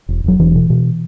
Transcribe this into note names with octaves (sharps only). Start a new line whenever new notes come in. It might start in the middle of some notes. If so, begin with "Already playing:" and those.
E1
E1 F#3
E1 E3
B2
B2